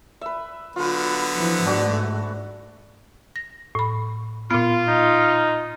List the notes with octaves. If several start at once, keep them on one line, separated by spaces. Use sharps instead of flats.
B4 E5
D3 F#3 B3 F4 B4
E3 F3
G#2 A3 D4 F#4
A#6
A2 B5
A#2 B3 F4
D#4